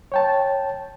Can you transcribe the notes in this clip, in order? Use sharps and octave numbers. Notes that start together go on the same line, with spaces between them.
C#5 G5 A5